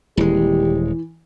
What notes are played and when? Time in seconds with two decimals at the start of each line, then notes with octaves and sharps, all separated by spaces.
0.17 D#1 E3 G#3 G4